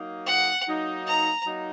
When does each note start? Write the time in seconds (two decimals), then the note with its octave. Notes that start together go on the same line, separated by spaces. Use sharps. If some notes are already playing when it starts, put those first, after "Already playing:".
Already playing: F#3 A#3 D#4
0.26 F#5
0.67 F#3 A#3 D#4
1.07 A#5
1.46 F#3 A#3 D#4